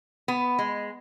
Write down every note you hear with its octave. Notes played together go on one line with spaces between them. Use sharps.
B3
G#3